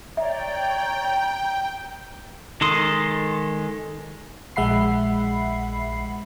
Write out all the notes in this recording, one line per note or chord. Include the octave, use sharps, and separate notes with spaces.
C#5 D5 E5 G5 A#5
D#3 G#3 A4 C6 D#6
A#1 G#3 E5 F#5 B5 C7